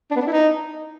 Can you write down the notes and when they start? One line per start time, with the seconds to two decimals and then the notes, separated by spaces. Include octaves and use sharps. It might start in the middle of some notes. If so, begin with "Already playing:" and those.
0.11 D4
0.16 B3
0.21 D4
0.27 E4
0.32 D#4